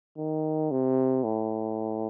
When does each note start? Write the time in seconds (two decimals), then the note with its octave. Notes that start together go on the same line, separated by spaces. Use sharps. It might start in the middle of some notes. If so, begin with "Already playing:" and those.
0.17 D#3
0.71 C3
1.24 A2